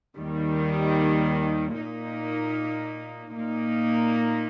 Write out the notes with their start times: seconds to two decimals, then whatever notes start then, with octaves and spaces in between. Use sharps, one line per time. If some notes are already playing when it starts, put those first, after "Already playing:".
0.17 D#2 D#3 G3
1.76 A#2 A#3 D#4
3.35 A#2 A#3 D#4